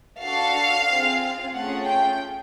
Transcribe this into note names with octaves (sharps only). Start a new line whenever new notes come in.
D4 F#4 A4 F5
C4 F4 G#4
A3 C#4 F4 G#4 F#5
G5